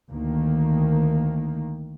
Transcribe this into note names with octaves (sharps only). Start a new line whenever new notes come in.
D2 D#3 A#3